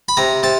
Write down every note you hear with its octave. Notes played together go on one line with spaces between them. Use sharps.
B5
C3 A#5
C3 A5